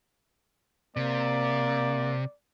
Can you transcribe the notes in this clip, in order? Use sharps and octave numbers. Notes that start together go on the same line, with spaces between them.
C3 A#3 D5